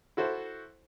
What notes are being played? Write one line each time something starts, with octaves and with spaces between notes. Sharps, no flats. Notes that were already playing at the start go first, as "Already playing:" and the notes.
E4 F#4 A4 C5